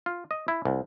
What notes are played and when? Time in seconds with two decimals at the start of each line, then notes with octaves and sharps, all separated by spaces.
0.06 F4
0.31 D#5
0.48 E4
0.65 C2